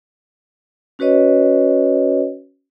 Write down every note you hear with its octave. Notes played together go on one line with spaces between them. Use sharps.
C#4 F#4 B4 C#5 D#5